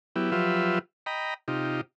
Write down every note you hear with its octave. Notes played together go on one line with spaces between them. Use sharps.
F#3 B3 E4 G4
F3 F#3 F4 G4 B4 E5
D#5 G5 A#5 B5
C3 D#4 F4 G4